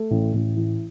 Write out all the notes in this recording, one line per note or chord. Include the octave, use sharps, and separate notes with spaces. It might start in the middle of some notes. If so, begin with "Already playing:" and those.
Already playing: A3
A1
A1
E3